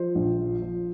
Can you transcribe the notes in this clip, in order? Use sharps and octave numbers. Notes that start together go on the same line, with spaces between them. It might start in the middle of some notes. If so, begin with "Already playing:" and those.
Already playing: F3 C5
A#1
F3
F3